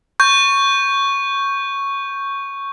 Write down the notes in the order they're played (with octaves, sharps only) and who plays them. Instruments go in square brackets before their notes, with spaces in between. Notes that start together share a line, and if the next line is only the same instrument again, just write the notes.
[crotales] C#6 G6